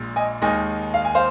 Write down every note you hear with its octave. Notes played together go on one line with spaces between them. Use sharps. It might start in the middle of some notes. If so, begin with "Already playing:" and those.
Already playing: A#1 A#2 G#3
D#5 G#5
D#2 D#3 G#3 D#4 D#5 G#5
F5
G#5
C5 F5